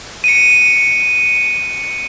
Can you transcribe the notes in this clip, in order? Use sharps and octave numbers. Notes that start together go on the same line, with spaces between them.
C#7 D#7